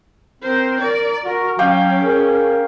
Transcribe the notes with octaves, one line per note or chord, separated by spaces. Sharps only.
C4 A#4 C5
A#4 D5
F#4 A#4
F#3 C#4 F5 G5 D6
G#4 A#4